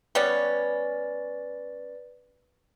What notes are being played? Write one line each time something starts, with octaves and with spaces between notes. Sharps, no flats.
G3 B3 C#4 B4 D5 A6